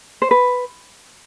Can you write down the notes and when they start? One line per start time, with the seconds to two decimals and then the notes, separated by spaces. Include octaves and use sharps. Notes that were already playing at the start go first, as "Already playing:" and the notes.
0.22 C5
0.31 B4